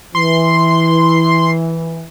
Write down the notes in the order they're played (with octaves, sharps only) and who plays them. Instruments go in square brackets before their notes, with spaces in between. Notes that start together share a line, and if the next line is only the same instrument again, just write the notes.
[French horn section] E3 [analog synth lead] C6